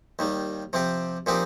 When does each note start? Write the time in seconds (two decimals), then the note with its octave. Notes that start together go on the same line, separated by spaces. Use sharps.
0.19 D#2 D#3 G3
0.73 C3 F3 C4 G4
1.26 A#2 F3 C4 D#4 G4